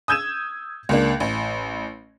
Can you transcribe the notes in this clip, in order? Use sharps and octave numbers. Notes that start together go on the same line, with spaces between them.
D#6 E6 G6 G#6 D#7 E7
C#2 A#3 D4
A1